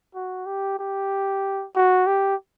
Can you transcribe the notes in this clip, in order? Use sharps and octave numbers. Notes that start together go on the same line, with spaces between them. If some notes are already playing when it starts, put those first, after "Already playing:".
F#4
G4
G4
F#4
G4